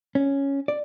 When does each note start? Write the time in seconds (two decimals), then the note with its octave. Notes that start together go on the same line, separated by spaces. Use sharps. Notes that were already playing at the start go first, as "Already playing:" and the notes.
0.15 C#4
0.68 D5